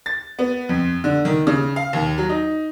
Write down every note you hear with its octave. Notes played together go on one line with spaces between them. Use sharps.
A6
B3
F2
D3
D#3
C#3
F5
D#2
F#3
D#4